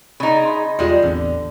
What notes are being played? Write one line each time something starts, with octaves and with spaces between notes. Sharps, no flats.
C#3 D#4 B5
D#5 B5 C6
E2 G3 G#3 F4
A1 E2 D3 C4